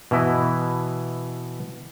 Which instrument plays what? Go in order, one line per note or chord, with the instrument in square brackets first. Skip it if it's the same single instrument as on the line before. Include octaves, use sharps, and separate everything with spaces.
[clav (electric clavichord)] B2 E3 E4 B4 D#5